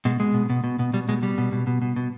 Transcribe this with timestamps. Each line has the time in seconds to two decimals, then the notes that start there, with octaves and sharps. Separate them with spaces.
0.05 B2 G#3
0.20 B2 G#3
0.34 B2
0.50 B2
0.64 B2
0.79 B2
0.93 B2 G3
1.09 B2 G#3
1.23 B2 G3
1.38 B2
1.52 B2
1.67 B2
1.82 B2
1.96 B2